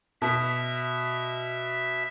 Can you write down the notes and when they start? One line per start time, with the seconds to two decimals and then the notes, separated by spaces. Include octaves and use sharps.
0.22 B2 E5 B6